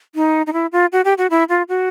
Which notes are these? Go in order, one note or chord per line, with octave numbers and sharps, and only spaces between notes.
D#4
D#4
E4
F4
F#4
G4
F#4
E4
F4
F#4